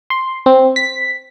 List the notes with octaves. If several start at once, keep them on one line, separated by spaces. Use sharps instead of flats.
C6
C4
B6